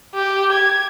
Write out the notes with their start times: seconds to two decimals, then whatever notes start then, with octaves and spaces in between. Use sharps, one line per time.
0.15 G4
0.52 G#6